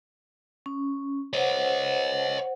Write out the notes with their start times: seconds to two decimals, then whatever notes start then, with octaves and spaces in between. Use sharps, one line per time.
0.66 C#4
1.33 C5 C#5 D#5 F#5